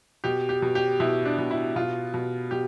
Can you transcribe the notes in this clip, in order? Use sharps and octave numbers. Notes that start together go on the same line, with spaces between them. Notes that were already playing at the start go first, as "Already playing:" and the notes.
B2 G4
G4
B2
G4
B2 E4
D4
B2
E4
B2 F4
B2
B2 G4